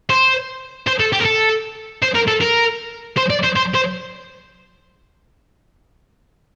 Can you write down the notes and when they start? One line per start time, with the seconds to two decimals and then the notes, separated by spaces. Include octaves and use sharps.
0.10 C5
0.87 C5
1.00 A4
1.13 G4
1.21 A#4
1.25 A4
2.02 C5
2.15 A#4
2.28 A4
2.41 A#4
3.17 C5
3.30 D5
3.43 C5
3.56 C5
3.75 C5